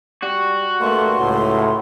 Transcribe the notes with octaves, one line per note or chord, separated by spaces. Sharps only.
G3 F#4
G2 A3 A#3 C6
C#2 A2 F#4